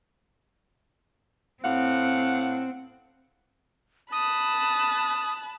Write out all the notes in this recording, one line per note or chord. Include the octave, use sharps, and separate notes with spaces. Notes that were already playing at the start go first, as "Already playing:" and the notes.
A2 C4 F5 F#5
A5 B5 D#6 F#6